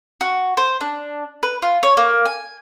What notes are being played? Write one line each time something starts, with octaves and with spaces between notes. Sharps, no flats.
F#4
C5
D4
B4
F4
C#5
A#3
G#5